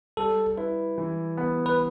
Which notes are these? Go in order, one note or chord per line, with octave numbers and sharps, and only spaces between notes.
G3 A4
E4 B4
E3
B3
B4